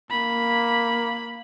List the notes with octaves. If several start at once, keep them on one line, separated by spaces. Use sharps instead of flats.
A#3 B5